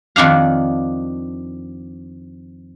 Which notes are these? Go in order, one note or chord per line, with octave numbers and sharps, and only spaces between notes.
F2 D#3 D4 F5